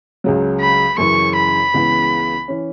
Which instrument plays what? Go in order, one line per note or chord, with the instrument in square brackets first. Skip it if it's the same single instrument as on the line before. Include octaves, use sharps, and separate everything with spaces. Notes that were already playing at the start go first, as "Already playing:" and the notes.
[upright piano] C#2 C#3 F#3
[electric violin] B5
[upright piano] F#2 C#3 E3 [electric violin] C#6
[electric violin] B5
[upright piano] C#2 C#3 E3 B3 E4
E3 C#4